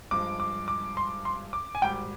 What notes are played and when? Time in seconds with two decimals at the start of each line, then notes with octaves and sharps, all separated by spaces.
0.11 G2 F3 G#3 D6
0.40 D6
0.68 D6
0.97 C6
1.25 C6
1.53 D6
1.75 G#5
1.82 G#1 G#2 G3 G5